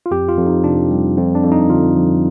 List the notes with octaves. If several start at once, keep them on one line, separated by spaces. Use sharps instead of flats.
F4
F2 G4
F4
F2
D#4
C3 D4
G3
F2 C4
D4
F2
D#4
D3 F4
F3